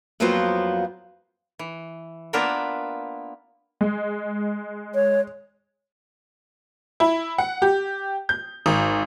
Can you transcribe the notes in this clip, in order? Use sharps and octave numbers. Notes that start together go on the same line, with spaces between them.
F2 F#3 A#3 B3 F4 C5
E3
A#3 B3 D4 F4 A#4 E5
G#3
C#5
E4
F#5
G4
G6
G#1